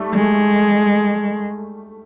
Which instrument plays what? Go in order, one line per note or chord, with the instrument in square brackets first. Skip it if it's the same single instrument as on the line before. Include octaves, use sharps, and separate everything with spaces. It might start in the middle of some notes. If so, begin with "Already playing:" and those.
Already playing: [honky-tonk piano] G3 A3
[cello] G#3